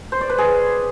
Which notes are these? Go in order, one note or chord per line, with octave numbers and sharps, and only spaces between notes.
C5
D5
B4
G#4